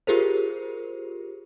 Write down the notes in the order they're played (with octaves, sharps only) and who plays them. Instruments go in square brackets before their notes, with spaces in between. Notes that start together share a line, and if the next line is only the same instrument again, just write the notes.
[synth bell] F4 G4 G#4 A#4 C5